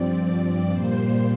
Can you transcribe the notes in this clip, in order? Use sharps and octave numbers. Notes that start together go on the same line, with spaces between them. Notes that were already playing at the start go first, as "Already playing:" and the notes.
Already playing: G2 F3 C4 D5
D5
A#2 G3 A#3 C5